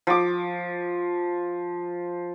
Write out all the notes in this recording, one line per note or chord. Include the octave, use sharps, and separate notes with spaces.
F3 D6